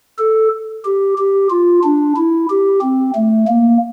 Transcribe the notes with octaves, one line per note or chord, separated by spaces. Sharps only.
A4
G4
G4
F4
D4
E4
G4
C4
A3
A#3